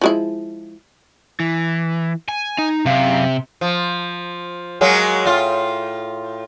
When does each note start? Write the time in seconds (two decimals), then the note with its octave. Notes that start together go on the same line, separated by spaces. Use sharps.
0.01 F3 G#3 E4
1.40 E3
2.29 G#5
2.58 D#4
2.86 F#2 C3 F5
3.61 F3
4.81 F#3 G#3 A#3
5.25 A2 F4